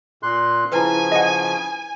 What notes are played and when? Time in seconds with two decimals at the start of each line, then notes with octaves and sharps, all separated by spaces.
0.23 A#2 C6 F#6
0.72 C#3 F3 E4 B4 G#5
1.12 D#5 F#5